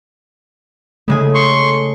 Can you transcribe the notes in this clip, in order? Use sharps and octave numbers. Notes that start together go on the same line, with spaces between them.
C#3 G#3 A3 G#5
C6 C#6